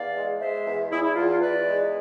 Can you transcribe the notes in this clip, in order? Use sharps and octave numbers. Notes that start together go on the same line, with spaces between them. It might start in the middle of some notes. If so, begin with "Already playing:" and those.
Already playing: E2 D5 F5
G#3
G#3 C5 E5
E2
E2 E4 G#4
E4
E2 F4
F4
E2 B4 D5
G#3